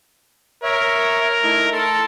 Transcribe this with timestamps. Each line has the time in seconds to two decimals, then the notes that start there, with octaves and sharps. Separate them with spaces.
0.63 A#4 C#5 E5
1.43 A3 D#4 E4
1.73 A4 A5 C6